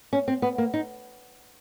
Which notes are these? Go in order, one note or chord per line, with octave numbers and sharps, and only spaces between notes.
C#4
C4
B3
A#3
D#4